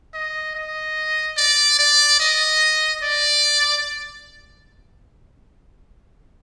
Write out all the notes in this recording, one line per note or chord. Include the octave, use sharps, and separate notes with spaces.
D#5
D#5
D5
D5
D#5
D5